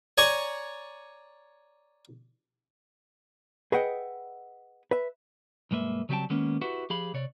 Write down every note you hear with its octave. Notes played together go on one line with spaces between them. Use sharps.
C#5 D5 G#5 A#5 C#6
G#4 B4 D#5 E5 F#5 G5
B4 E5
B1 G2 G#3 A#3 B4 E5
C#3 F#3 G3 C4 G5 A5
D#3 G#3 A#3 B3 C#4
E4 F#4 G4 B4 F#5
F3 G4 G#4 F5 B5
C3 C#5 D5